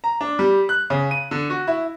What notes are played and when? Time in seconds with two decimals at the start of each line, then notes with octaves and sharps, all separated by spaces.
0.04 A#5
0.21 D4
0.39 G3
0.69 F#6
0.90 C#3
1.11 D#7
1.31 D3
1.50 F#4
1.67 E4